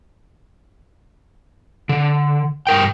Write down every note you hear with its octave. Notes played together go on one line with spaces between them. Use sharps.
D3
G2 A#4 G5